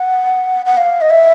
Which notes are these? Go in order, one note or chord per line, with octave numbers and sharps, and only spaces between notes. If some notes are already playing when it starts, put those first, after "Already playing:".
Already playing: F#5
F#5
F5
D#5
E5